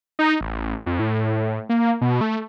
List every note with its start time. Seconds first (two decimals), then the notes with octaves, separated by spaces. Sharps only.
0.19 D#4
0.41 A1
0.86 F2
0.99 A2
1.69 A#3
2.01 B2
2.21 A3